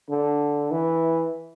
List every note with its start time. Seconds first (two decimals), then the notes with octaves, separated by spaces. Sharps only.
0.10 D3
0.71 E3